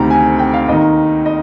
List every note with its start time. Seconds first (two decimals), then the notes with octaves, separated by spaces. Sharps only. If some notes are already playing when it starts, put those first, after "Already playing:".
Already playing: D2 C3 D#3 A#5
0.10 G#5
0.39 G5
0.53 F5
0.68 D#2 D#3 D#5
1.26 D#5